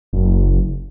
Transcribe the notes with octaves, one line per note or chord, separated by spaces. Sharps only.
F#1